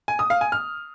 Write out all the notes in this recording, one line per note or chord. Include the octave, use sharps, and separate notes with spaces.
G#5
D#6
F5
G#5
F6